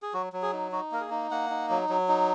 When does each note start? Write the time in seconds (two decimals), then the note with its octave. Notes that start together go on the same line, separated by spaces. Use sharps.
0.02 G#4
0.13 F#3 F#4
0.33 F#3
0.42 G#4
0.53 D#4
0.72 D#4 F#4
0.92 A#3 A#4
1.01 G#4
1.11 D#4
1.31 A#3 F#5
1.50 D#4
1.70 F#3
1.89 F#3
2.08 D#4